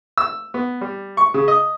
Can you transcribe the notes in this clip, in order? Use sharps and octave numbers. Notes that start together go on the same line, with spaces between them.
E6
B3
G3
C#6
C#3
D#5